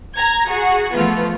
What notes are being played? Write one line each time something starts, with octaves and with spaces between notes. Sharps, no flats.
A#5 G#6
F#4 G#4
F3 A3 B3 F4